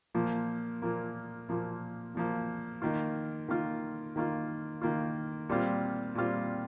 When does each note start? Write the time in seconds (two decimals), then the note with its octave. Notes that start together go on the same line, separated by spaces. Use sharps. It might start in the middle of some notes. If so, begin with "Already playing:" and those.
0.14 A#2 F3 A#3
0.82 A#2 F3 A#3
1.49 A#2 F3 A#3
2.15 A#2 F3 A#3
2.82 D#3 A#3 F4
3.48 D#3 A#3 F4
4.16 D#3 A#3 F4
4.82 D#3 A#3 F4
5.49 A#2 G3 C4 F4
6.15 A#2 G3 C4 F4